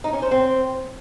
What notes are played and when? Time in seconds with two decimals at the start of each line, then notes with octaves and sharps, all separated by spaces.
0.04 D#4
0.13 C#4
0.22 C5
0.31 C4